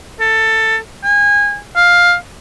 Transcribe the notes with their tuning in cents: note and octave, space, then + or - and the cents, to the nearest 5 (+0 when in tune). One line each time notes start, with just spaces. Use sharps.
A4 +15
G#5 -25
F5 +10